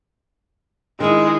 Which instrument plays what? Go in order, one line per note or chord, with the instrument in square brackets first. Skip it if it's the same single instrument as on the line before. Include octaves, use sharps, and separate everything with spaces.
[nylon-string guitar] D#3 D4 E4 [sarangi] G#3